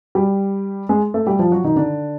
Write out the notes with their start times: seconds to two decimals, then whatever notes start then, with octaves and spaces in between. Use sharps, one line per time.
0.15 G3 G4
0.89 G#3 G#4
1.14 A3 A4
1.26 G3 G4
1.39 F3 F4
1.51 F#3 F#4
1.64 D#3 D#4
1.76 D3 D4